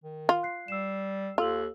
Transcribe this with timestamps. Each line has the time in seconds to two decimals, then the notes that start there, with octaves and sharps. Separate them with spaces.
0.04 D#3
0.29 F4
0.43 F#6 C7
0.68 G3 E6 C7 E7
1.38 D#2 F4 A4 E6 F#7